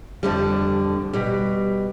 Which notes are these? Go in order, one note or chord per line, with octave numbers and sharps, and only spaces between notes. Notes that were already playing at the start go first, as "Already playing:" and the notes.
F2 D3 G3
B2 G3